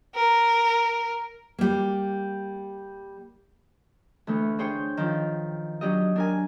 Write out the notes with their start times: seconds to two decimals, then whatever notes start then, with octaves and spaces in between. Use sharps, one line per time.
0.15 A#4
1.58 G3 A#3
4.27 D2 E3 A3
4.58 D4 G#4 C5 C#5 G5
4.97 D#3 F3
5.81 F#3 D4 G4 D#5
6.16 D4 A#4 G#5